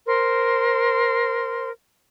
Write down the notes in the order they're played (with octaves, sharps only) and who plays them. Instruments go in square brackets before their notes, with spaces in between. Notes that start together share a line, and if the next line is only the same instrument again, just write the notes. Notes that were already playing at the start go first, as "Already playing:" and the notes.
[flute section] A#4 C5 C6